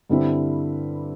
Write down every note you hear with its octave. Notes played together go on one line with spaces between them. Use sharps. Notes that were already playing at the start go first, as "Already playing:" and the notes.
G2 D3 G3 C4 E4